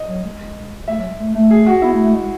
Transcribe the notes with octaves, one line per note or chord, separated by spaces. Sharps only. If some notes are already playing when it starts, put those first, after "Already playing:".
Already playing: D#5
F#3
G#3
A3 E5
F#3
G#3
A3
A3
G#4
F#4
B3 E4
A3
A3
G#3